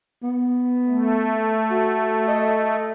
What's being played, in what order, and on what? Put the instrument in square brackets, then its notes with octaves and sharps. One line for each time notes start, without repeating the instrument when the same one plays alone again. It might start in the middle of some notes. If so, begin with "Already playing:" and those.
[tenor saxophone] B3
[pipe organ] A3
[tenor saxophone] F#4
D#5